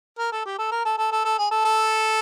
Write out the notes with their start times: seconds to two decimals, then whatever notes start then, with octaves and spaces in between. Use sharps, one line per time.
0.19 A#4
0.32 A4
0.46 G4
0.59 A4
0.72 A#4
0.85 A4
0.98 A4
1.12 A4
1.25 A4
1.38 G#4
1.51 A4
1.65 A4